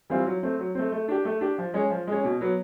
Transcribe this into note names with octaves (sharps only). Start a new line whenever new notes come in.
E3 G3 C4 F4
F#3
A3 C4
F#3
A3 C4
A3
D4 G4
A3
D4 G4
F3
G#3 C#4
F3
G#3 C#4
B2
F#3 B3